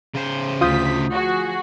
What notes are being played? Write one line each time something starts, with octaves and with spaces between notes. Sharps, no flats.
C#3 C5
D2 F4 D#6 G6 B6
F3 F#4 G#4